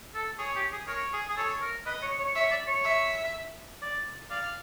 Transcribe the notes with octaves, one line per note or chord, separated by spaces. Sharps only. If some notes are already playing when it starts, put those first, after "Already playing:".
A4
G#4 C#5
G4
G#4
A#4 C#5
G#4
G#4
A4 C#5
A#4
B4 D#5
C#5
C#5
C#5 E5
D5
C#5
E5
D5
D5 F5